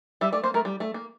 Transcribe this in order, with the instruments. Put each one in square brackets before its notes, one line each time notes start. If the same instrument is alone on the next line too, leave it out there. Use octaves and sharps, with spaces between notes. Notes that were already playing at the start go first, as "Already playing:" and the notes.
[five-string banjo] G3 [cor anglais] E5
[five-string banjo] A3 [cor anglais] D5
[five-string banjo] A#3 [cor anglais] C5
[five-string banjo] A3 [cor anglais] A#4
[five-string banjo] G3
A3
A#3